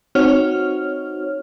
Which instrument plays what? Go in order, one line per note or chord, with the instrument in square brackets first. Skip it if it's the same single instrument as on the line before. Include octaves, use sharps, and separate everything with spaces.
[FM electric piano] C4 D#4 F#4 C#5 F6